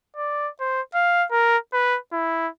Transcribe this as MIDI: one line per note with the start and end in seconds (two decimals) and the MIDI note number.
0.17 0.49 74
0.60 0.81 72
0.94 1.25 77
1.31 1.57 70
1.73 1.98 71
2.12 2.48 64